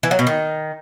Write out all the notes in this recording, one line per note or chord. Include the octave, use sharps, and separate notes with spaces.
E3
F#3
B2
D#3